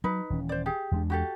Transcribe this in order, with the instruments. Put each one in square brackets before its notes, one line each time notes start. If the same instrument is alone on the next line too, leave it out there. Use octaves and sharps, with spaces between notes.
[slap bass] F#3 [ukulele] D#4 B4
[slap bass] D#1 E3 C#4
[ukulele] C5 D5
G4 G#4
[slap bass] E2 G#3 D4
[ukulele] F#4 G4 A4